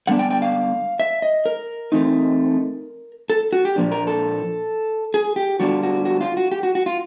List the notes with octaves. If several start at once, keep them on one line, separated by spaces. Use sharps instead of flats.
D3 G3 B3 D4 F#5
G5
G5
F5
E5
D#5
A#4
E3 A3 C4 D#4
A4
F#4
G4
A#2 F3 A#3 D4
A#4
A4
G#4
G4
D3 G3 B3 D4 F4 F#4
F#4
F#4
F4
F#4
G4
F#4
F#4
F4